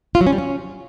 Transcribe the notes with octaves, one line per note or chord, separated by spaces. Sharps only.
F4
F#3
C#4
G3
C#4